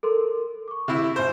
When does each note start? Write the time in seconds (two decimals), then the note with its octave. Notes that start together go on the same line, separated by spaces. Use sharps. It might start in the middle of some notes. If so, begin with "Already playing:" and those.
0.03 A4 A#4 C6
0.68 C#6 D6
0.88 C3 E4
1.16 G#1 C5